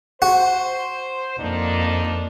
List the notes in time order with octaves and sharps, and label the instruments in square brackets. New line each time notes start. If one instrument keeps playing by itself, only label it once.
[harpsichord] F#4 [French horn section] C5
[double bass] F2 A#3 [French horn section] F3 D4 D#4